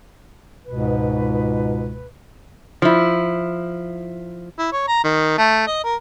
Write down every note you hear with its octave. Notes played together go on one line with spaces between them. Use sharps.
C#2 G#2 B2 B4
F3 E4
E4
C#5
A#5
D#3
A3
D#5
A#4